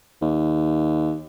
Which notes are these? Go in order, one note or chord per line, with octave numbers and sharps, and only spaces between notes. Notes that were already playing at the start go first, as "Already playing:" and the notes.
D#2